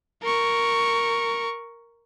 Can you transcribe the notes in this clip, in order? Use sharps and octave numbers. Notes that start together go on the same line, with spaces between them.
A#4 C#6